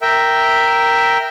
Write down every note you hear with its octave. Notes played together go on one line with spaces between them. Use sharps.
A#4 E5 G5